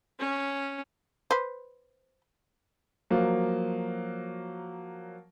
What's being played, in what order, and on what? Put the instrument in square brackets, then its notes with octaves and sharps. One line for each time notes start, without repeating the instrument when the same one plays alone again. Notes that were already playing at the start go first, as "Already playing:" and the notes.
[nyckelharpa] C#4
[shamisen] B4 C5
[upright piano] F3 F#3 A#3